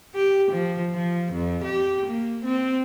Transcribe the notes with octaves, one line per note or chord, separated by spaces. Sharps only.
G4
F3
F3
F2
G4
A#3
C4